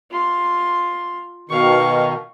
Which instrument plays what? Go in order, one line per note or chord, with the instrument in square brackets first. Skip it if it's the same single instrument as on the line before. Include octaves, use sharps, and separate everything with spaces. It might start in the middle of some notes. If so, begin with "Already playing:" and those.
[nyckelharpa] F4 C6
[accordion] B2 D#3 [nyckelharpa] F5 C#6